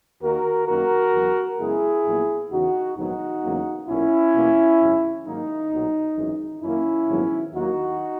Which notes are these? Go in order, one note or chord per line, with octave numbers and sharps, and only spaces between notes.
D#2 D#3 A#3 F#4 A#4
F#2 D#3 A#3 F#4 A#4
E2 C#3 F#3
F#2 C#3 G#3 B3 E4 G#4
A#1 A#2 F#3 B3
E2 C#3 E3 D#4 F#4
A#1 G#2 D#3 F#3 B3 D#4 F#4
E2 C#3 F#3 A#3
B1 A#2 A#3 C#4 E4
E2 B2 A#3
G#1 F#2 C#3
G#2 D#3 F#3 A#3 D#4
B1 A#2 F#3
G#1 F#2 E3 G#3
F#2 D#3 A#3 C#4 E4
A#1 G#2 D#3 F#3 B3
D#2 D#3 F#3 A#3 D#4 F#4